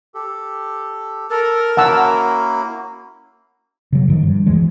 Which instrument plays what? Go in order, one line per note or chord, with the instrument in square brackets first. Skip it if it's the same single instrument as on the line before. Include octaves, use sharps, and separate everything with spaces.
[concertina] G4 A4
[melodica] A4 [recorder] A#4 [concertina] A5 F6
[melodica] A#3 [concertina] C#4 E4 F#4 [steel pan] F#5 A5 E6
[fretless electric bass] C#3 F#3
G2 D#3 F3
G2
D#1 D2 E3 G#3